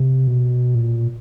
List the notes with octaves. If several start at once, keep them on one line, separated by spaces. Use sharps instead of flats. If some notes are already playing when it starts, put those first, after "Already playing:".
Already playing: C3
B2
A#2